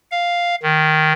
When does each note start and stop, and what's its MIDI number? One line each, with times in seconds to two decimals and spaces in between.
0.11 0.55 77
0.63 1.13 51